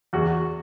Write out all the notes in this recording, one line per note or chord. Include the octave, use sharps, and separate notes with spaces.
E2 F#4